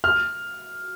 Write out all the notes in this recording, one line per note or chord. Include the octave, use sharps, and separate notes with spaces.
F6